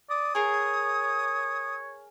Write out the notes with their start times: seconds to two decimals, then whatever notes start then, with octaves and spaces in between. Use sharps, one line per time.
0.10 D5 D#6
0.35 G#4 A#4 C#5